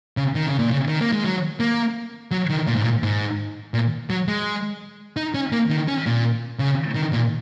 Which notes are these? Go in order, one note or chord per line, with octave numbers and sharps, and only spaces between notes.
C#3
D#3
C#3
A#2
C#3
D#3
A#3
G#3
F#3
A#3
F#3
D#3
A#2
G#2
A#2
G#2
A#2
F#3
G#3
D#4
C#4
A#3
D#3
C#4
A#2
C#3
D#3
A#2